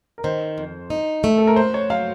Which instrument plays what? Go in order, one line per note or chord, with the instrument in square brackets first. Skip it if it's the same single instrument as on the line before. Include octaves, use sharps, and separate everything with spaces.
[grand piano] A#4
[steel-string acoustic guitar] D#3 [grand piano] C5
[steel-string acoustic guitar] F2
D#4
A3
[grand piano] A4
A#4
[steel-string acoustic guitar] F#4 [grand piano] C5
[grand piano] C#5
[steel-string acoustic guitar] F#3 [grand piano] F5